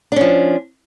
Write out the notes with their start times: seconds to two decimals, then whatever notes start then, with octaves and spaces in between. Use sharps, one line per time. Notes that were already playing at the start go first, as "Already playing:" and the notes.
0.12 D4
0.16 C#4
0.21 F3